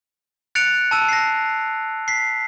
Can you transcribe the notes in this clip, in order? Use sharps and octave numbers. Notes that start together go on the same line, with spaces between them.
F#6 A6 C#7 D7 F7
A5 E6 D#7
A#6 C7
B6 C7